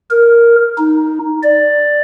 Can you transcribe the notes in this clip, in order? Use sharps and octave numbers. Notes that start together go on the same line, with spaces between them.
A#4
D#4
D5